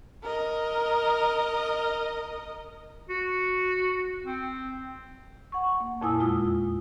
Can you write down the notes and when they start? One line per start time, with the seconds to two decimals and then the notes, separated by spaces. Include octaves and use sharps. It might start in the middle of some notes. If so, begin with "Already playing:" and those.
0.23 A#4 D#5
3.09 F#4
4.26 C4
5.52 F#5 C#6
5.80 A#3
6.01 F2 A#2 E4 G#5 D#6 E6
6.19 E2 G#3 F4 D#6